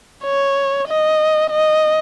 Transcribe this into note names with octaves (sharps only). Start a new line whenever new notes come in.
C#5
D#5
D#5